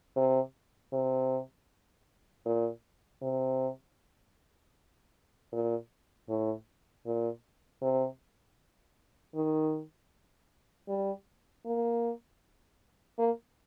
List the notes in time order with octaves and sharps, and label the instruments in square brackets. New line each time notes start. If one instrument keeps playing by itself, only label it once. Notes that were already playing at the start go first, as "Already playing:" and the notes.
[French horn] C3
C3
A#2
C3
A#2
A2
A#2
C3
D#3
G3
A#3
A#3